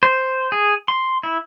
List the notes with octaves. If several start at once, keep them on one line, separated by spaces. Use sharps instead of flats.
C5
G#4
C6
E4